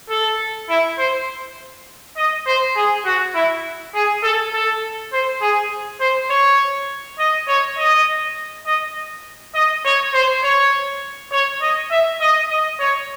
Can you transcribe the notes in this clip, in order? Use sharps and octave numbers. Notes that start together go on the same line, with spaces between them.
A4
E4
C5
D#5
C5
G#4
F#4
E4
G#4
A4
A4
C5
G#4
C5
C#5
D#5
C#5
D#5
D#5
D#5
C#5
C5
C#5
C#5
D#5
E5
D#5
D#5
C#5